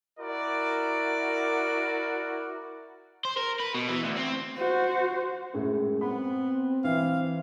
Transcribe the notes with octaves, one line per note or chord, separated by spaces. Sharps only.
E4 F#4 A#4 D5
C5
A#4
B4
B2
E3
D2
C4
F#4 C5
F#2 A2 G#3
B3 C4 B5
E3 E5 F5